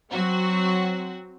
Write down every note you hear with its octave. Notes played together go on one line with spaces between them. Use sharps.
F#3 C4 F#4